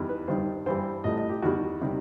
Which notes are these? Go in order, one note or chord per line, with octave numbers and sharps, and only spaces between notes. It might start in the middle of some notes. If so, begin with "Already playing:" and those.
Already playing: E2 D#3 G3
B4
G2 D#3 G3 C5
G2 E3 G3 C5
A1 A2 G3 D#5
D#5
G4
E2 D#3 G3 F#4
C3 D#3 G3